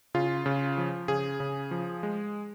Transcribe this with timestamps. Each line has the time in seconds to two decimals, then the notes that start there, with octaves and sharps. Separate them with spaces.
0.14 C#3 F4
0.46 C#3
0.78 F3
1.08 C#3 G#4
1.40 C#3
1.71 F3
2.03 G#3